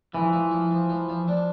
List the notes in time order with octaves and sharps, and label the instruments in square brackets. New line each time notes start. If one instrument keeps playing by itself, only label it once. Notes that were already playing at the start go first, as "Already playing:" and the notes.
[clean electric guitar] E3 [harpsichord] F3
[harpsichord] F3
F3
F3
F3
F3
D4